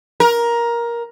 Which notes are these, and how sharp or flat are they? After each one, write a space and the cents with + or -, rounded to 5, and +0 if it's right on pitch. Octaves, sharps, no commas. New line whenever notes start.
A#4 +15